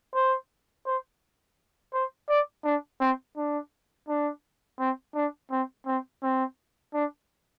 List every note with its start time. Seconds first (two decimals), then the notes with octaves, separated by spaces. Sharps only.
0.14 C5
0.86 C5
1.94 C5
2.29 D5
2.64 D4
3.00 C4
3.37 D4
4.08 D4
4.80 C4
5.15 D4
5.51 C4
5.86 C4
6.23 C4
6.94 D4